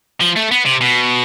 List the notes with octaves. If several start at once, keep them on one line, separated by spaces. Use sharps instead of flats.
F3
A3
B3
C3
B2